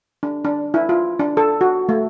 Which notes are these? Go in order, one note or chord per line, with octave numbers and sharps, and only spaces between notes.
D4
D4
E4
F4
D4
A4
F#4
A3